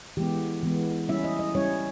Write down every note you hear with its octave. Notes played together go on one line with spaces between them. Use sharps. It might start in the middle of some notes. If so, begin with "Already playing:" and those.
E3 G#3 B3 G4
E3 G#3 B3
G3 C#4 E4 E5
D#5
D#5
G3 C#4 E4 C#5